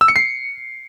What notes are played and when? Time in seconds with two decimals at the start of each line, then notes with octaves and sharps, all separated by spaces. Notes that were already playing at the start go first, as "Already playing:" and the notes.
0.01 E6
0.08 C#7
0.16 C7